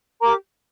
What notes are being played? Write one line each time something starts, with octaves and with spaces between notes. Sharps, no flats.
G4 A#4 A#5 D6